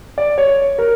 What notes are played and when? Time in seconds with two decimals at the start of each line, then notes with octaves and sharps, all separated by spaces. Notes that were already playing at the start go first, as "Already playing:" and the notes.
0.18 D5
0.38 C#5
0.78 A#4